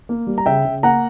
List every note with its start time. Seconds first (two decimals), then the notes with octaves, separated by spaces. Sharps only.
0.09 A#3
0.27 G3
0.38 A#5
0.46 C#3 E5 G5
0.65 C#3
0.83 A#3 F#5 A#5